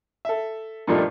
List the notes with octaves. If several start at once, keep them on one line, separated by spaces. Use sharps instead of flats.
A4 E5
G2 A#2 F3 G3 A3 D#4